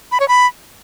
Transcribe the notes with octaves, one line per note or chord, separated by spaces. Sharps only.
B5
C#5
B5